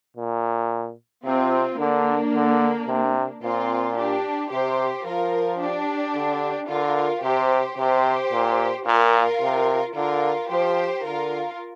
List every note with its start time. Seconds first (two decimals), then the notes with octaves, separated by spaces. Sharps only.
0.17 A#2
1.26 C3 C4 F4
1.80 D3 A#3 D4
2.35 D3
2.88 C3
3.43 A#2 C4 F4
3.97 D4 G4
4.52 C3 G4 C5
5.06 F3 F4 A#4
5.61 D4 G4
6.16 D3
6.69 D3 F4 A#4
7.24 C3 G4 C5
7.78 C3 G4 C5
8.33 A#2
8.87 A#2 F4 A#4
9.42 C3
9.96 D3 F4 A#4
10.50 F3 G4 C5
11.05 D3 F4 A#4